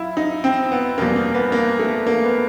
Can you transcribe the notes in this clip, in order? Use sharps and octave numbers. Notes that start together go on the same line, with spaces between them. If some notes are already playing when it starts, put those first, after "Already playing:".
Already playing: F#2 E4 F4
D#4
C4
B3
E2 B2 G3 A#3
A#3
B3
A#3
A3
A#3
B3